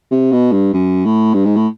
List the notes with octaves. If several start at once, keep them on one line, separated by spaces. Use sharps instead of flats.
C3
B2
G2
F#2
A2
G2
G#2
A2